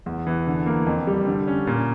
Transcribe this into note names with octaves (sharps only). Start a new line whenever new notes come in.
E2
E3
D3
A#3
F2
G3
D3
C#4
A#2